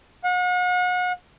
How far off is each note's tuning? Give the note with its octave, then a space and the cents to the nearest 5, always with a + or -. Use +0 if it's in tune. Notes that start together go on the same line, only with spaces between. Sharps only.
F#5 -40